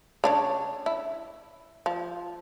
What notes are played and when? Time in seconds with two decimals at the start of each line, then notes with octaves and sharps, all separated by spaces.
0.24 C#3 D4 C#5
0.86 E4
1.86 F3